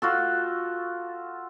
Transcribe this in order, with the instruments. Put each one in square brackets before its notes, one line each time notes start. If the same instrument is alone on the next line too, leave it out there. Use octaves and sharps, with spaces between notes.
[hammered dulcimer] F4 F#4 A4